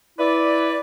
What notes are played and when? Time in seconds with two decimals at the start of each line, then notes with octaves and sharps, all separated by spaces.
0.19 E4 B4 D5